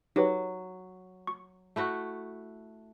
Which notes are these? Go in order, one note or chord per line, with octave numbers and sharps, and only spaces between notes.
F#3 D#4 G4 B4
C#6
A3 E4 F#4